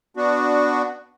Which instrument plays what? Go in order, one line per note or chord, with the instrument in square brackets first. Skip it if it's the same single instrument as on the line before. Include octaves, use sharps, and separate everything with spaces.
[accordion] B3 D4 F#4